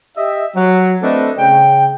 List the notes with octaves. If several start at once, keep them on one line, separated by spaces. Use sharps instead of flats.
G4 D#5 E5
F#3
A3 C4 D4 A4 B4 D#5
C#3 G5